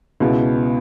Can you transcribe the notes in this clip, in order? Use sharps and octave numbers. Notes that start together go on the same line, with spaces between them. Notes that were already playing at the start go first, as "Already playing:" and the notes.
C#2 B2 B3 E4